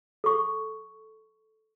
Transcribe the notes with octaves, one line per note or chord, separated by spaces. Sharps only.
A4 C#6